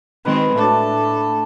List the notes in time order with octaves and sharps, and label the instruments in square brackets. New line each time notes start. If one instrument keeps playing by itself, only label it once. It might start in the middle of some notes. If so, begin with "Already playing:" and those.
[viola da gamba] D#3 G#3 C4 [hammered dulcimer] B4
[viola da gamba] A2 A4 [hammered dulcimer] A3 D4